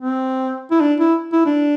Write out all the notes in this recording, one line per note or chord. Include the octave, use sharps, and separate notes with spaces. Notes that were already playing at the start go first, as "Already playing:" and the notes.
C4
E4
D4
E4
E4
D4